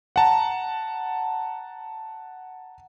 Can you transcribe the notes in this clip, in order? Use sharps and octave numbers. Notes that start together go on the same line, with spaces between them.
F#5 A5 A#5